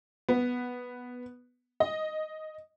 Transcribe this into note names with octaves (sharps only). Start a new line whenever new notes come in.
B3
D#5